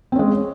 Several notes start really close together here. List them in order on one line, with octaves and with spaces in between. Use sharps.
C4 C#4 G#3